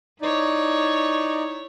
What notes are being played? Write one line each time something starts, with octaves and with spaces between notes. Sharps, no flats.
D#4 E4 C#5 D5